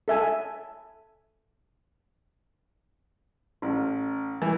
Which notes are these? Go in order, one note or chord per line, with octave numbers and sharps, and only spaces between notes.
A4 E5 G#5
A1
E3